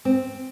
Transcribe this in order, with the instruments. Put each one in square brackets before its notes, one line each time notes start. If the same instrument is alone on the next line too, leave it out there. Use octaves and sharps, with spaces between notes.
[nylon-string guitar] C4